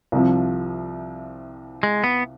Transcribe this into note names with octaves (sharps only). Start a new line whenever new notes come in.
C2 C3 F3
G#3
B3